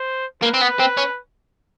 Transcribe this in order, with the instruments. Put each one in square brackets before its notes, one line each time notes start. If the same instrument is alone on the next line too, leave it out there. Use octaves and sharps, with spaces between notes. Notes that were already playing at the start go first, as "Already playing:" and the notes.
Already playing: [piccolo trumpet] C5
[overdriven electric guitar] A#3 [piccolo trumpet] B4
[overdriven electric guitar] C4
B3
C4
C#4